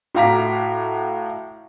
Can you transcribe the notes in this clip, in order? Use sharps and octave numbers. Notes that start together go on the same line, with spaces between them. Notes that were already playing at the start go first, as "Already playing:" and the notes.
A2 F#4 F5 A#5 D6 B6